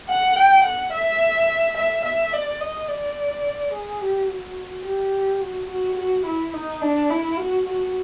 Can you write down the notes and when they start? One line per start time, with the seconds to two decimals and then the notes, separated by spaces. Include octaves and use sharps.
0.09 F#5
0.36 G5
0.65 F#5
0.93 E5
1.78 E5
2.05 E5
2.33 D5
2.61 D#5
2.89 D5
3.74 G#4
4.01 G4
4.29 F#4
4.85 G4
5.41 F#4
5.70 F#4
5.97 F#4
6.26 E4
6.53 D#4
6.81 D4
7.10 E4
7.38 F#4
7.66 F#4